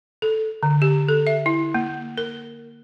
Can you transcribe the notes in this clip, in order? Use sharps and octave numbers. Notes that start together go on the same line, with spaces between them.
A4
D3
G4
A4
E5
E4
A#3
A#4